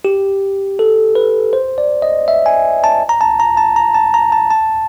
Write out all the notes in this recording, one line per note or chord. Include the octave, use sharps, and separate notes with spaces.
G4
A4
B4
C5
D5
D#5
E5
G#5
A5
A#5
A5
A#5
A5
A#5
A5
A#5
A5
A5